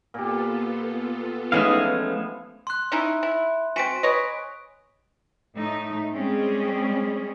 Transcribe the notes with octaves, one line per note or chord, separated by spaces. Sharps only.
A#2 B3 F4 G4 A4
E3 F3 G#3 A3 B3 C#4 D#4 F5
C6 F#6
C#4 D#4 E4
E4
C4 F#4 G#5 B6 D7
B4 C#5 D#5
A2 A3 D#4
G3 G#3 C4 C#4 G#4